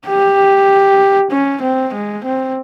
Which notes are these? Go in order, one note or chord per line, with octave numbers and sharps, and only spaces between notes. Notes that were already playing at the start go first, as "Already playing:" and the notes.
G4
C#4
C4
G#3
C4